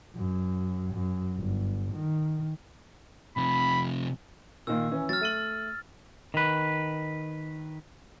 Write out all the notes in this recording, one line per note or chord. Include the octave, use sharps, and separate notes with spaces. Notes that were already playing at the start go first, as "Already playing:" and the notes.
F#2
F#2
G1
D#3
C3 F3 B5
A#2 D#3 A#3 E6
E3 C#4
F#3 F6 A6
A3 D#7 F#7
D#3 B4